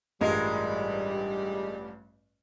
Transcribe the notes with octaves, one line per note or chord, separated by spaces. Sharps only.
A1 G2 E3 G3 G#3 F4 A#4